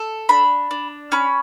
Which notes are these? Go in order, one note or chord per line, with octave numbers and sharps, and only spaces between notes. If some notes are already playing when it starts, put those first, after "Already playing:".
Already playing: A4
D4 B5
D4
C#4 B5